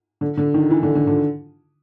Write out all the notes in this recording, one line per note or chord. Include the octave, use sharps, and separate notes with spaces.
D3
D3
D#3
E3
D3
D3
D3